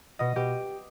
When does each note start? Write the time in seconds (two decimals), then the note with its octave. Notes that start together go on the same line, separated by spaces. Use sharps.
0.19 B2 D#5
0.36 B2 G4